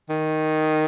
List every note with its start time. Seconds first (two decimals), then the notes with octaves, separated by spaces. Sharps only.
0.10 D#3